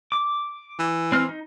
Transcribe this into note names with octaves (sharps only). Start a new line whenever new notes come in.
D6
E3
C4 F6
D#4